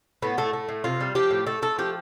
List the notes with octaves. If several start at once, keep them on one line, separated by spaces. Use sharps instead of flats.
A2 B3
A2 A3
A3
A2
C3 F4
G3
F3 G4
A2
A3 A4
A3 A4
F3 G4